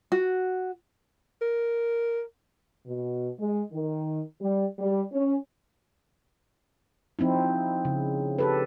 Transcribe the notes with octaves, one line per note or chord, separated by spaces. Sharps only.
F#4
A#4
B2
G#3
D#3
G3
G3
C#4
F3 C4 D#4 E4
C#3
G4 A4 B4